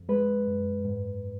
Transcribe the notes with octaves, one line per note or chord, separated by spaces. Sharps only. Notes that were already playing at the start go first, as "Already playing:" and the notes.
Already playing: F2
G#3 B4
F#2
G#2